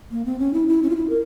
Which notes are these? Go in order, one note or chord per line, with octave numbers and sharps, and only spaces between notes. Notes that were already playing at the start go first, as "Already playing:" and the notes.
A#3
C4
C#4
E4
E4
C#4
F4
E4
A#4